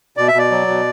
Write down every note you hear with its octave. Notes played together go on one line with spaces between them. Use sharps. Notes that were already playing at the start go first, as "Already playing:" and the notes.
B2 D5
E5
B2 D5
F#3
B2